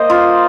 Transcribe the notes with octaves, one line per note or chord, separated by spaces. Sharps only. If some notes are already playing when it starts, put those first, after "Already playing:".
Already playing: A#3 C5 D#5
F4